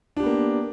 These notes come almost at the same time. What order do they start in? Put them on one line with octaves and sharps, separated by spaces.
D4 G4 B3 A#3